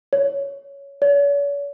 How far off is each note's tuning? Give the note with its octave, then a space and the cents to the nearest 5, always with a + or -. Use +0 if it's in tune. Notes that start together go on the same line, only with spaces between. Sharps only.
C#5 +10
C#5 +45